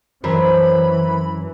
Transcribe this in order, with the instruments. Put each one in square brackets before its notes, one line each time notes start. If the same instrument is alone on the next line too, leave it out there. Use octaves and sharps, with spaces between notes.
[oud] F#2 [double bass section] E3 [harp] C4 A#4 [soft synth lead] B5